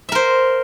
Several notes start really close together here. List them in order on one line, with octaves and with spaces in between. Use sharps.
E5 A#4 C5